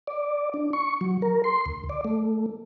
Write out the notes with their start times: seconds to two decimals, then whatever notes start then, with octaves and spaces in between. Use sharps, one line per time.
0.07 D5
0.54 D4
0.73 C#6
1.01 F#3
1.22 A#4
1.44 C6
1.66 D2
1.89 D5
2.05 A3